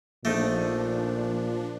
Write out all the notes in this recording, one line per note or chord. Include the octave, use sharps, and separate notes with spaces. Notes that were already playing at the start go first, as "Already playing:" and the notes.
A#1 A#2 F3 A3 D4 D#4 G5